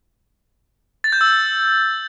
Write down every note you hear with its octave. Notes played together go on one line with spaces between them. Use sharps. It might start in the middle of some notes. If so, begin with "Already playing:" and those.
A6
G6
E6